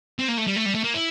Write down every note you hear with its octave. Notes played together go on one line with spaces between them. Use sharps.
C4
A#3
A3
G3
A3
G3
A3
A#3
E4